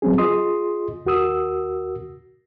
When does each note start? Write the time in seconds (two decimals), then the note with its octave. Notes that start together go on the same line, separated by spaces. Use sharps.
0.02 F#3 G3 C4 C#4 G#4
0.18 F4 G#4 D#5 C6 D#6
1.06 D#2 F#4 A#4 D#6 E6